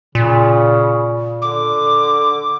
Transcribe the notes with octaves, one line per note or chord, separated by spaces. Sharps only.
A#2 C#3
D3 D6